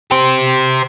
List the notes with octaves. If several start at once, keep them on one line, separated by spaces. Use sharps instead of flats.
G4 C5